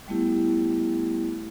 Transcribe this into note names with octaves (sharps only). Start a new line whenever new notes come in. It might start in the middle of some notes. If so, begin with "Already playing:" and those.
G3 A3 B3 E4 G4